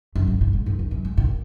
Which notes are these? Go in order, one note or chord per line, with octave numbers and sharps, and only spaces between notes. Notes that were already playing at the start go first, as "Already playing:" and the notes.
F#2
G#2
A#2
G#2
F#2
E2
F#2
G#2
A#2